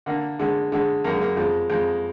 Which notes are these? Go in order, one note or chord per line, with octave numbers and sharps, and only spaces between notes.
D3 A#3
D3 G#3
D3 G#3
F#2 A#3
G#3
A#3
F2 G#3
F2 G#3